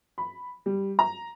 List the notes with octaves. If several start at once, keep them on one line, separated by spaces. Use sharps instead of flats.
B5
G3
A#5